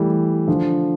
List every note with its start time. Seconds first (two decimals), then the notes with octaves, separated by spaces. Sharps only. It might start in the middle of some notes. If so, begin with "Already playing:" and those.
Already playing: E3 G3 A3
0.48 D3 F3